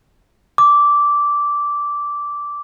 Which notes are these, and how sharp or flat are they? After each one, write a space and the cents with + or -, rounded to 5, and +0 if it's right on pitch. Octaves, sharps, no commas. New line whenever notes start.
D6 -10